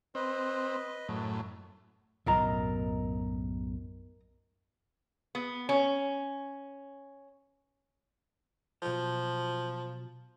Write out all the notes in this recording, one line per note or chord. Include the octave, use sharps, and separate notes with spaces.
C4 B4 D#5
F#2 A2
B1 F#2 A2 A#4 D#5 A#5
B3
C#4
B2 F3 F#3 A5